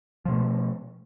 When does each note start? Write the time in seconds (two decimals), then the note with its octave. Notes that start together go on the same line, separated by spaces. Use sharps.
0.25 F3
0.28 B2
0.31 A3